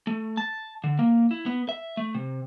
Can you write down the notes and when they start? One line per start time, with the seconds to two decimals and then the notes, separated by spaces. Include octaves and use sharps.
0.07 A3
0.37 A5
0.84 D3
0.99 A#3
1.31 E4
1.46 B3
1.69 E5
1.97 A3
2.15 C3